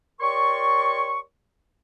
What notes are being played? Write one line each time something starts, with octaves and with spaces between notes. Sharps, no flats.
G4 A#4 C#5 D5 C6 C#6